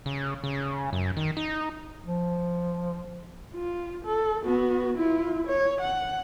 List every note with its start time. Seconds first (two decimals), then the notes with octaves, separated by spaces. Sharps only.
0.06 C#3
0.44 C#3
0.93 F#2
1.17 D#3
1.37 D#4
2.04 F3
3.55 F4
4.05 A4
4.43 B3 F#4
4.97 E4 F4
5.47 C#5
5.81 F#5